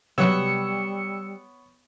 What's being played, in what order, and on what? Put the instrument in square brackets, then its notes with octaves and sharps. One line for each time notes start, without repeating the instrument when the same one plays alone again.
[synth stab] C3 F#3 [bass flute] G3 [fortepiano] B3 C#5 F#5 [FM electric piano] E6 C#7